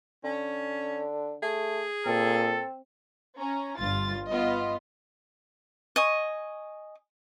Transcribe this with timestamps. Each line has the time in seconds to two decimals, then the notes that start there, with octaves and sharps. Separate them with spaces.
0.24 D3 C#4
1.43 A3 G#4
2.06 A#2 C4 A4
3.37 C#4 A#5
3.76 G1 G2 F4 A6
4.29 B3 F4 D#5
5.96 D#5 G#5 C#6